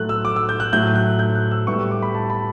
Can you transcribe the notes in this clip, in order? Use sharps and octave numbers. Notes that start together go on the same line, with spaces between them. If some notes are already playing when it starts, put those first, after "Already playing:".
Already playing: A2 F#3 A3 F#6
E6
D6
E6
G6
F#6
A2 F#3 A3 G6
F#6
G6
F#6
E6
A2 G3 B3 C#6
E6
D6
B5
A5
B5